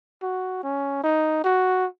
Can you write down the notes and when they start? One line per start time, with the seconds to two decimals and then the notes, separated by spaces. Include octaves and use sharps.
0.23 F#4
0.63 C#4
1.04 D#4
1.44 F#4